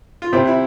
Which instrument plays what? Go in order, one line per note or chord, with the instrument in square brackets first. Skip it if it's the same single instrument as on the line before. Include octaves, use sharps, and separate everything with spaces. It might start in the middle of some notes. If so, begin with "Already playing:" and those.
[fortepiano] F4
[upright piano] C3 [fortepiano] C4 E4
[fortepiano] E4